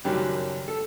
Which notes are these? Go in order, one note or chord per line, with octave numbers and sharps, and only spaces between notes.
F#1 F#2 D#3 F#3 G3 G4
A4